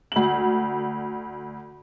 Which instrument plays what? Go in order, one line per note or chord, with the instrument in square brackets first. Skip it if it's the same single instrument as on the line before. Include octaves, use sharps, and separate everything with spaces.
[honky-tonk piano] D2 F#7